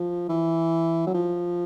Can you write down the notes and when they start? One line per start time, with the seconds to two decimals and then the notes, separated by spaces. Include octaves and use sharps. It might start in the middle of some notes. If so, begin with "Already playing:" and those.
Already playing: F3
0.29 E3
1.07 F#3
1.14 F3